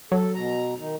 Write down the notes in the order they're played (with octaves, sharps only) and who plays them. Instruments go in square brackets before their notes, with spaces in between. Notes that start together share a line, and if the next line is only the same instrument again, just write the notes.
[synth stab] F#3 [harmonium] A4
[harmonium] B2 A#5
D#3 D#4